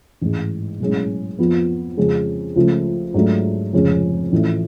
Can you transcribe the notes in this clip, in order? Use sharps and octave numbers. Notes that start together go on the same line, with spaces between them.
A1 G#2 G#3
B1 A2 G#3 C#4
F2 F3 B3 F4
F2 C#3 G#3 C#4 G#4
C#2 C#3 F3 A3
G#2 F#3 A3 D4
F1 F2 C#3 G#3 C#4
A1 A2 F3 A3